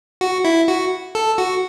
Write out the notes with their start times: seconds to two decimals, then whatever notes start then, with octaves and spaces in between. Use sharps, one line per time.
0.21 F#4
0.45 E4
0.68 F#4
1.15 A4
1.38 F#4